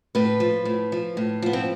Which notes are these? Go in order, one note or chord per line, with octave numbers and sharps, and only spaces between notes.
A2 B4
F3
A2
F3
A2
F3 B3
C4